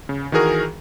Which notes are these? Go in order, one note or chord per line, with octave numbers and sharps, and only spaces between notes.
C#3
D#3 E3 F#4 G#4 A#4